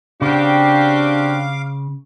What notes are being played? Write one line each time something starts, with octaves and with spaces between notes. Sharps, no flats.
C#3 C4 D4 F#4 G4 F5 D6